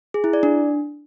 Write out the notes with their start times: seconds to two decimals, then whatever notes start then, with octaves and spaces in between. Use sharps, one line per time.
0.14 G#4
0.24 E4
0.33 D5
0.43 D4